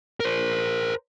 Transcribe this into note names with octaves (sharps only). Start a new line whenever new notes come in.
A#4 C5